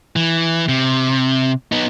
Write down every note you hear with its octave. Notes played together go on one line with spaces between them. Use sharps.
E3
C3
B3 D#4